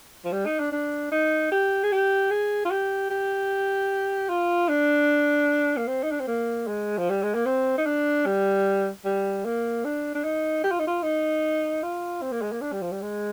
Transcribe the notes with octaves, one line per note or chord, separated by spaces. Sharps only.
F3
G3
D#4
D4
D4
D#4
G4
G#4
G4
G#4
F4
G4
G4
F4
D4
A#3
C4
D#4
D4
C4
A#3
G#3
F3
G3
G#3
A#3
C4
D#4
D4
G3
G3
A#3
D4
D4
D#4
G4
F4
D#4
F4
D#4
F4
C4
A#3
G#3
A#3
D4
G3
F3
G3
G#3